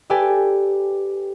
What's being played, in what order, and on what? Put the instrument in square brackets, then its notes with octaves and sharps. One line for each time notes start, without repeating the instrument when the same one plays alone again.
[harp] G4 A4 B4 D5 G5 G#5